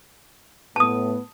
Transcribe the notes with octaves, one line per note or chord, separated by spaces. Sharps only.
A2 B3 A5 D#6